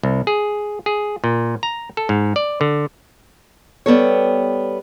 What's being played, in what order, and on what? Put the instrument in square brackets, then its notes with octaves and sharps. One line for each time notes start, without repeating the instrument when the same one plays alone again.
[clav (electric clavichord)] C2
G#4
G#4
A#2
A#5
A4
G#2
D5
D3
[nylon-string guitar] G3 B3 A4 C#5